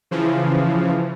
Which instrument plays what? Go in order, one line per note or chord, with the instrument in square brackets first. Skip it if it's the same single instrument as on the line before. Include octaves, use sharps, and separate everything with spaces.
[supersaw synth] C#3 E3 F3